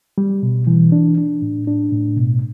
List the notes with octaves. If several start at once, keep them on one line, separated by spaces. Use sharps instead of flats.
G3
B2
E3
D4
D4
A2
D4
A2
B2